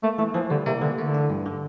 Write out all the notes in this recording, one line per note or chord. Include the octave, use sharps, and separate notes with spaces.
A3 A#3
E3 A3
E3 F3
D3 G3
C3 A#3
D3 E3
D3 A3
D4
G2
D3